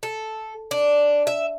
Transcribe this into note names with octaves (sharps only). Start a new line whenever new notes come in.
A4
D4
E5